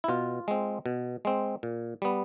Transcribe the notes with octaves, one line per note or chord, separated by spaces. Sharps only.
E4
B2 F4
G#3 C4
B2
G#3 C4
A#2
G3 B3